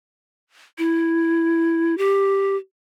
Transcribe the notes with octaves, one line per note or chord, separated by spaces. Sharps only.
E4
G4